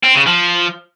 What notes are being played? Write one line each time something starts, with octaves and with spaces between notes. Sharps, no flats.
C4
C#3
F3